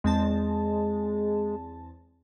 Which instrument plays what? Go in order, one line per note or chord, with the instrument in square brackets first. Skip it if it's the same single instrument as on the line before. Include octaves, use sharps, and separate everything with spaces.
[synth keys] E2 C4 A5 [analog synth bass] G#3